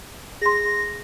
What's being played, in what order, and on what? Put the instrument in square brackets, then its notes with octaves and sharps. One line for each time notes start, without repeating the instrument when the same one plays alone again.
[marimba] G#4 C6 [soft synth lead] A#6